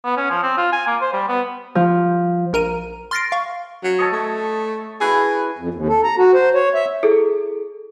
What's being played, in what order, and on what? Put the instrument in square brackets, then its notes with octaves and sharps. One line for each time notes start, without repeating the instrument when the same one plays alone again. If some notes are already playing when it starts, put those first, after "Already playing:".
[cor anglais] B3
C#4
F3
C4
F4
G#5
A#3
C5
G3
B3
[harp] F3
[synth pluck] A#1 A#4 A#5 D#7
C6 F6 A6 A#6 C7 D7
F5 C#6
[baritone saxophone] F#3
[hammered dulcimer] A4 C#5 D#5
[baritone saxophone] A3
[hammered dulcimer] E4 F#4 B4 [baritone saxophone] G#4
[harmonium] F2
D#2
A4
A#5
F#4
C5
C#5
E5
[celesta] E4 G#4 A4